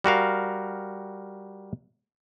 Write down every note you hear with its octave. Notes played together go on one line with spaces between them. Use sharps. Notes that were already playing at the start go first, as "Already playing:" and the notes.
G3 F#4 A#4 F5